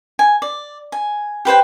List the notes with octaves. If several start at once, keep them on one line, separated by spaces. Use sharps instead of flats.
G#5
D5
G#5
G4 B4 C5 G5